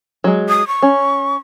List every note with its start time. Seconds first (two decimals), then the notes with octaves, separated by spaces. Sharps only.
0.24 F#3 G#3
0.49 D#6
0.67 C#6
0.83 C#4